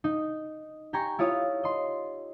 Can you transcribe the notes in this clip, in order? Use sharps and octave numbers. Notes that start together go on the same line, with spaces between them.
D#4
G4 G5 G#5 A#5 C#6
E4 F4 C#5 F5 D#6
D#5 C6